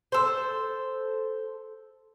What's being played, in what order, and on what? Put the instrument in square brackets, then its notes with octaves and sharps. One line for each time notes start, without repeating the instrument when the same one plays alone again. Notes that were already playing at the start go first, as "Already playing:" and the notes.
[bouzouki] A4 C5